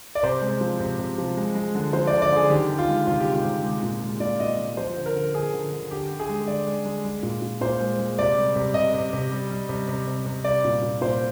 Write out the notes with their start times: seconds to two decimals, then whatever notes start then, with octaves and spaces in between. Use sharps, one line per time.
0.15 D5
0.23 C3 C5
0.42 G#3
0.61 F3
0.80 C3
0.99 C3
1.18 F3
1.37 G#3
1.55 G#3
1.75 D3
1.93 F3 C5
2.07 D5
2.12 D3
2.22 D5
2.32 D3 G#4
2.50 D#3 G4
2.70 D#3
2.78 F4
2.88 G#3
3.07 C3 F4
3.20 G4
3.26 G#3
3.34 F4
3.45 C3
3.64 G#3
3.83 A#2
4.02 G#3
4.20 A#2 D5
4.40 A#2 D#5
4.58 G#3
4.77 F3 C5
4.97 D3
5.06 A#4
5.15 D3
5.34 D3 G#4
5.53 D3
5.72 D3
5.91 D3 G4
6.10 D3
6.19 G#4
6.29 G#3
6.47 D3 D5
6.67 G#3
6.85 G#3
7.05 G#3
7.23 A#2
7.42 A#2
7.61 A#2 C5
7.80 G#3
7.99 G#3
8.18 C3 D5
8.37 G3
8.56 C3
8.74 C3 D#5
8.94 C3
9.13 C3
9.31 G3
9.51 G3
9.69 C3
9.88 C3
10.07 C3
10.26 C3
10.44 G3 D5
10.64 A#2
10.83 A#2
11.01 A#2 C5